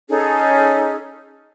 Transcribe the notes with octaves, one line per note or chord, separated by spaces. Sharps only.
C#4 D#4 G#4 A4